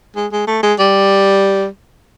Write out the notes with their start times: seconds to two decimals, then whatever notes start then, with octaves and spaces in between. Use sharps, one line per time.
0.16 G#3
0.32 G#3
0.47 A3
0.63 G#3
0.79 G3